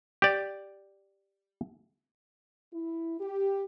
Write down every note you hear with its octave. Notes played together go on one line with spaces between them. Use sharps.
G4 D5
E4
G4